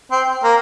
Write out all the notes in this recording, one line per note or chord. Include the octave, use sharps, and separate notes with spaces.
C4
A#3